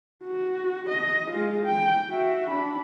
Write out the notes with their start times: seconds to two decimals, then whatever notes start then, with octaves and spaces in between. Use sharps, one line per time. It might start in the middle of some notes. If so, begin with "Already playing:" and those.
0.24 F#4
0.89 D#5
1.31 G#3 F4
1.66 G5
2.11 F#4 E5
2.49 D4 B5